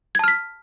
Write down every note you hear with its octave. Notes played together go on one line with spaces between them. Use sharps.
A5 F6 G#6 B6